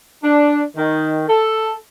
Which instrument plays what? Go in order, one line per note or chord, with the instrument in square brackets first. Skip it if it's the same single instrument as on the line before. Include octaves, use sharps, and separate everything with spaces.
[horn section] D4
D#3
A4